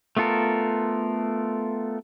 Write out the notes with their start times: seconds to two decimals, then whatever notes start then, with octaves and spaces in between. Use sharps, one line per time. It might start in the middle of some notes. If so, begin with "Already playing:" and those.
0.17 A3 B3 F4 A4 A#4